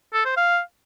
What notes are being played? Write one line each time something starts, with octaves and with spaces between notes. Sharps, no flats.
A4
C5
F5